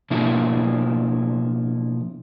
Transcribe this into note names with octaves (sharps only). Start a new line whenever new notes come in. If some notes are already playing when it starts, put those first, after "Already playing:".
B2 F3 A#3 D4 E4